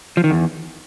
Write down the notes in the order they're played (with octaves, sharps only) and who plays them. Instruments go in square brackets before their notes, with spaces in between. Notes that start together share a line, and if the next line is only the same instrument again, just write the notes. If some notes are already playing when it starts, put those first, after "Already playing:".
[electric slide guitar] F3
D#3
E2